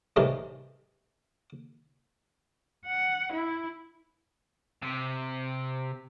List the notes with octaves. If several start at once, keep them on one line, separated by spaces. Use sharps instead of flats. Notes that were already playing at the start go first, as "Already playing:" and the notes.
A2 C3 D#3 E3 G3 A3
F#5
E4
C3